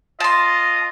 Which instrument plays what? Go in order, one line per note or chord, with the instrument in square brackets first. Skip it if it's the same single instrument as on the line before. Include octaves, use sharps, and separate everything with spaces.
[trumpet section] F4 D#5 [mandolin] A5 C6